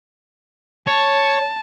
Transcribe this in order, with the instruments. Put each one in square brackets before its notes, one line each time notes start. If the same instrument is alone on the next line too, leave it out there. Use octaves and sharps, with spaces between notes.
[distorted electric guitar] C#5 [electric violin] A5